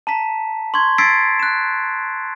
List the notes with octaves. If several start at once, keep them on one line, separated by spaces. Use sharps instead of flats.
A5 A#5 B6
C6 C#6 G#6
E6 G#6 A6 B6 C7 D7
F#6 E7